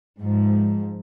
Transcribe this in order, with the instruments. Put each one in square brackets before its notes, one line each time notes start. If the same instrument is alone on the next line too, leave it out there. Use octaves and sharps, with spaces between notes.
[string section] G#2 F3